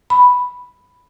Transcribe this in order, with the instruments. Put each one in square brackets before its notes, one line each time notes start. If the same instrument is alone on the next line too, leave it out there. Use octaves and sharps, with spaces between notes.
[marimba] B5